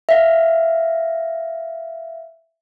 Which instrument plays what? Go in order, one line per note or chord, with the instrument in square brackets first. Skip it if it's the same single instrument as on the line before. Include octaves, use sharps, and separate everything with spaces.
[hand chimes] E5 F5